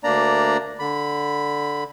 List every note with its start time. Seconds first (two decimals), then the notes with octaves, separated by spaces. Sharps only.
0.04 D2 A#3 D4 D5 A#5
0.79 D3 B5